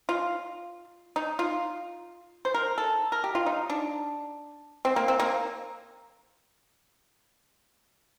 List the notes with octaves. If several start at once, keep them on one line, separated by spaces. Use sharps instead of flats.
F4
D#4
F4
C5
A#4
A4
A#4
G4
F4
D#4
D4
C4
A#3
C4
A#3